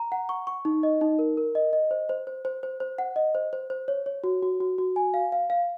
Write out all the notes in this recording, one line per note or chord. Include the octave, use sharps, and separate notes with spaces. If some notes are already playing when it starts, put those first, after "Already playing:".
Already playing: A#5
F#5
C#6
C#6
D#4
D#5
D#4
A#4
A#4
D#5
D#5
C5
C5
C5
C5
C5
C5
F#5
D#5
C5
C5
C5
C#5
C#5
F#4
F#4
F#4
F#4
G#5
F5
F5
F5